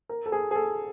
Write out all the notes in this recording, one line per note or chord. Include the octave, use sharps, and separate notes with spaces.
A#4
A4
G#4
G#4
A4